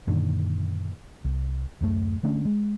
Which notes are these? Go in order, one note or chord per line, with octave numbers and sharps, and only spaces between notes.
F#2 A#2 D3 D#3
C2
D1 F#2 A3
D3 A3 C#4 D4
G#3